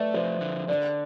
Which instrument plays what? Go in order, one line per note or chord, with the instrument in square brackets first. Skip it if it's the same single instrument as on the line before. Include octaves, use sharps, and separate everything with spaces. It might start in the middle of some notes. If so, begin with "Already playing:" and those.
Already playing: [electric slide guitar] A3 [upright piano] B4 D5 E5
[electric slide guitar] F3 [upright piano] C5
[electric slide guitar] D3
[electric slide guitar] D3 [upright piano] D5